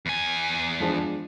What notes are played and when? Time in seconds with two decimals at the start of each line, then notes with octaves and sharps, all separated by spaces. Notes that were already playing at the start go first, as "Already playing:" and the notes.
0.06 E2 G#5
0.80 F3 G#3 D4